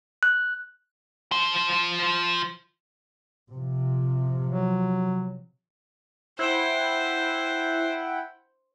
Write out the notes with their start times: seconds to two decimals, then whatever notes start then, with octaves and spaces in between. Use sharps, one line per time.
0.23 F#6
1.32 F3 C5
3.51 C3 F3
4.47 F#3
6.39 E4 C5 F#5 G5